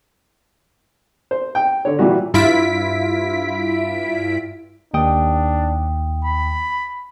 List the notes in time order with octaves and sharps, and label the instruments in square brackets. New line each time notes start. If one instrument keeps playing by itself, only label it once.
[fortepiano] C5
G5
D3 C#5
A#2 E3 G3 F#4
[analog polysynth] G2 E4 F4 B6 D7
[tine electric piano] D#2 G5 D#6 [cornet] D4
[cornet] B5